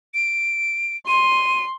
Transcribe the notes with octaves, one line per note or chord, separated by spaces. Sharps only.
D7
C6 D#7